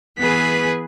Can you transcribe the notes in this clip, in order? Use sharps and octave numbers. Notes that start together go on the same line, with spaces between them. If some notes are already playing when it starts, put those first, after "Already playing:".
E3 B3 G#4 B4 B6